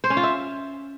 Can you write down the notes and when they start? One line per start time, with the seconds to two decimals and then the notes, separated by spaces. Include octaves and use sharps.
0.04 C5
0.10 C#4
0.17 F4
0.23 E5